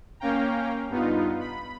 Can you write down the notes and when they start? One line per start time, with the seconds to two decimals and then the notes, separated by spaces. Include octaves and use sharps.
0.20 A#3 C#4 C#5 F5 G5 A#5
0.89 G2 B3 D#4 F4
1.40 B5